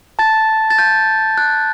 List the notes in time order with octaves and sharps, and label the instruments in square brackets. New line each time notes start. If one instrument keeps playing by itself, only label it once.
[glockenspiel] A5 A6
A6
G6
F#6